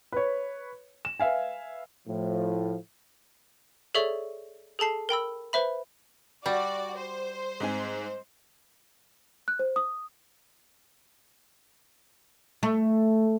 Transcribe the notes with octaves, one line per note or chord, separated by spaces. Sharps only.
B4 C#5
E7
B4 E5 F5 G#5
A2 F3
G#4 A4 C#5 D5 E5 C#6
G#4 A4 A5 C7
A#4 G5 B5 E6
B4 C5 E5 B5
G3 F#4 D5
C5
G#2 C4 G#5
F#6
C5
D#6
A3